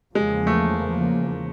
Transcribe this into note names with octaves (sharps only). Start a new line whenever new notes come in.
E2 C#3 F3 G#3 A#3
A3